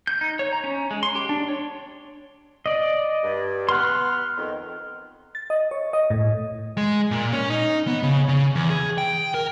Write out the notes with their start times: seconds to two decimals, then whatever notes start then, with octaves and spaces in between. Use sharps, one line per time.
0.07 G6
0.21 D#4
0.39 C#5
0.53 A#5
0.64 C#4
0.91 G#3
1.03 C6
1.15 G4
1.29 D4
1.49 C#5
2.66 D5 D#5
3.23 G2
3.69 B3 C6 F6 F#6
4.37 F2 D#3
5.35 A6
5.50 D#5
5.71 C#5
5.93 D#5
6.10 A2
6.78 G#3
7.11 A#2
7.33 C#4
7.50 D#4
7.87 B3
8.03 C#3
8.28 C#3
8.55 E2
8.70 G#4
8.98 G5
9.34 A#4